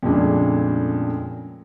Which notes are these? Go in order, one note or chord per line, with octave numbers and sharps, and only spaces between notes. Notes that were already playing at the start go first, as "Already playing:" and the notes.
F2 A#2 C#3 G#3 A3 D4